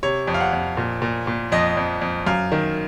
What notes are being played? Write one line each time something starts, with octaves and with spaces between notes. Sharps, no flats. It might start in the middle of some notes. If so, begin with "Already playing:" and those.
C3 C#5
F2
F5
F#5
F2
A#2
A#2
A#2
F2 D#5
F2
F2
F#2 F5
D#3